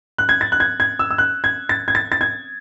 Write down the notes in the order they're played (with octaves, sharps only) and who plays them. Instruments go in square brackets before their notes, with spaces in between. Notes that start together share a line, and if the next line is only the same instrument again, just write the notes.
[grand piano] F#6
G#6
A6
F#6
G#6
G#6
E6
E6
F#6
G#6
A6
G#6
A6
A6
G#6